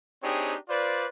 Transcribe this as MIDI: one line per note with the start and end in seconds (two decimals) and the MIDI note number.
0.23 0.56 60
0.23 0.56 62
0.23 0.56 63
0.23 0.56 67
0.23 0.56 68
0.23 0.56 73
0.68 1.06 65
0.68 1.06 71
0.68 1.06 72
0.68 1.06 74